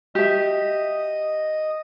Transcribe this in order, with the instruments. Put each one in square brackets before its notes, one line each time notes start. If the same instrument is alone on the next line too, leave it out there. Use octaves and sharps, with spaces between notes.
[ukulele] G4 E5 [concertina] D#5 D#6